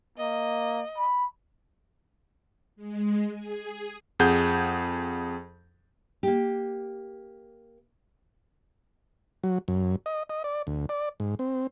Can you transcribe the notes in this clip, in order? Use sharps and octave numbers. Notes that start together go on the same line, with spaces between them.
A#3 D#5
B5
G#3
G#4
F2 G#4 F#5 G6
A#3 G4
F#3
F#2
D#5
D#5
D5
D2
D5
G#2
C4